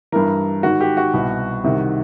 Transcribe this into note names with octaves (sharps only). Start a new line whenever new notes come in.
G2 E3 A#4
G#2 D#3 F#4
G4
F#4
C2 B2
C2 C3 D#3